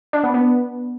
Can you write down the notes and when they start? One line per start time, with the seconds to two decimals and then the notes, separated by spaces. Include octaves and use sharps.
0.13 D4
0.24 B3
0.34 B3